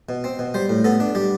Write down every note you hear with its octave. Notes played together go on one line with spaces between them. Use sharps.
B2
C4
B2
G3 C5
A2
B3 A4
D4
G3 G4